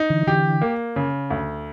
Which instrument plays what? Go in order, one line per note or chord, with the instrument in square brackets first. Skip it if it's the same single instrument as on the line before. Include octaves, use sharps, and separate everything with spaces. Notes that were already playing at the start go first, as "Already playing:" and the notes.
Already playing: [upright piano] D#4
[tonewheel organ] D3 E3
[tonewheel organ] D3 E3 [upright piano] G4
[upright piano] A#3
C#3
D2